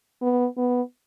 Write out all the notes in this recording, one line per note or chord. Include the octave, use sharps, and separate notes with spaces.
B3
B3